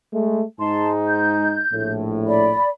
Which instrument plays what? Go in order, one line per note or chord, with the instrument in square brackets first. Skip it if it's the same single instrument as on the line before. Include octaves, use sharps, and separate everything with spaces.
[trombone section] G#3 A3
[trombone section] G#2 G#3 D#4 [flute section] A5 C6
[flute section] G6
[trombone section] A#1 A2
[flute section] D5 B5